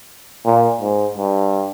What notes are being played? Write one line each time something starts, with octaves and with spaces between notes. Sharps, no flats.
A#2
G#2
G2